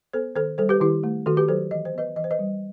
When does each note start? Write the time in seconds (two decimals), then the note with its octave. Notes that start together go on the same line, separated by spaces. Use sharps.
0.13 B3 A4 C5
0.35 D#3 A4 C5
0.58 G3 A4 C5
0.69 G4 B4
0.80 D#3 E4 G4
1.03 A3
1.26 D#3 F#4 A4
1.37 G4 B4
1.48 F#3 A4 C5
1.71 E3 D#5
1.85 C5
1.94 B3 B4 D#5
2.16 E3 D#5
2.24 C5
2.31 B4 D#5
2.39 G3